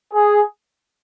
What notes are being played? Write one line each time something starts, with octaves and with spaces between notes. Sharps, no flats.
G#4